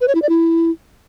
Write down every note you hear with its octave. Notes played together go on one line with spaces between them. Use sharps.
B4
C#5
E4
D5
E4